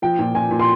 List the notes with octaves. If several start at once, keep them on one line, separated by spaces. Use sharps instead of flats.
F3 G5
A#2
A#2 G#5
A#2
C6